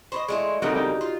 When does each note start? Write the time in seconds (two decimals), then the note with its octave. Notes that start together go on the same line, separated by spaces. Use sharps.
0.12 C5 C#5 D#5 B5 C#6
0.28 G#3 A3 E4 D5 D#5 C6
0.62 C#3 G3 A#3 C4 D4 D#4 F#4 A4
0.76 D#4 F#4 G4 G5
1.01 F4